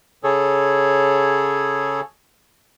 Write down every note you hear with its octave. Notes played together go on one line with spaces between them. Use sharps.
C#3 G#4 A4 C#5